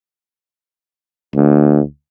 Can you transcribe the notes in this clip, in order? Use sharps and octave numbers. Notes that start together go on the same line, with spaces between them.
D2